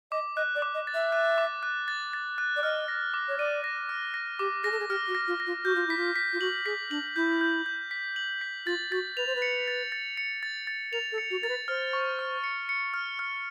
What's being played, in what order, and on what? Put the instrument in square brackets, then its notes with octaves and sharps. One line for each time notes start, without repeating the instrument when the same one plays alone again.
[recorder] D#5 [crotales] D6
[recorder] D#5 [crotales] F#6
[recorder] D5
[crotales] D6
[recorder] D#5
[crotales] A6
[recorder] E5
[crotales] F#6
D6
F#6
A6
A6
F#6
[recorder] D5
[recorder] D#5 [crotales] F6
[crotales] A#6
D6
[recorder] C#5
[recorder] D5 [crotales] D#7
[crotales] A#6
F6
A#6
[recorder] G4 [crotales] D6
[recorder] G#4 [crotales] A#6
[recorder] A4
G#4
[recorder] G4 [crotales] F6
[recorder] F#4
[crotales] A#6
[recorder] F4
[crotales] A#6
[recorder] F4
[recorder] F#4 [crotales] G6
[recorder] F4
[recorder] E4 [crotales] B6
[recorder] F4
[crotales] B6
[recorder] F4
[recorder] F#4 [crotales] F#7
[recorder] G#4 [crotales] B6
[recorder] D4 [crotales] F#7
[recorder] E4 [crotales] G6
[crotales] G6
G6
B6
F#7
B6
[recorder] F4 [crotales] A6
[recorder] F#4 [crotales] A6
[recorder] B4 [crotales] F7
[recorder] C5
B4
[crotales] C#7
A6
A6
C#7
A6
A6
[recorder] A#4 [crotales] F7
[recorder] A4
[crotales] C#7
[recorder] F#4
[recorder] A#4 [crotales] A6
[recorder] B4
[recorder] C5 [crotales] F6
[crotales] C#6
F6
C#7
C#7
F6
F6